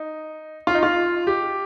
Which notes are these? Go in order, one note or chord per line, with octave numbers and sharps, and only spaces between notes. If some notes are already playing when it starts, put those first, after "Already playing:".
Already playing: D#4
F4
D#4
F4
G4